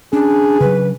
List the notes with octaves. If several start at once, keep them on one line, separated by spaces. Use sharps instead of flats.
C#4 D4 G#4
C#3 F#3 B4